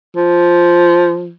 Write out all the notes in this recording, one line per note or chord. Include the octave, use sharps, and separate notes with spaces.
F3